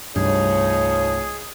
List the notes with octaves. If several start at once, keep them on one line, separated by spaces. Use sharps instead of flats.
C2 G2 F3 A3 D#4 G#4 C#5